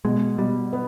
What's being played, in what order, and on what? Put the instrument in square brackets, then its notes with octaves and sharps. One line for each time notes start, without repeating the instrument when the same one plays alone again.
[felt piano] B2 [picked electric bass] G#3
[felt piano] B2 [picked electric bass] G3
[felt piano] B3